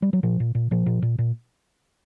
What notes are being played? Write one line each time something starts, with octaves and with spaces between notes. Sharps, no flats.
G3
F#3
A#2 F3
A#2
A#2
A#2 F3
A#2
A#2
A#2